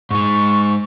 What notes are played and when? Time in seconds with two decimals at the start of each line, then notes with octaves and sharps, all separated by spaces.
0.11 G#2 G#3 C#6